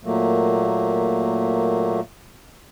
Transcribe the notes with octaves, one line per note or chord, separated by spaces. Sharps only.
A#2 F#3 A3 A#3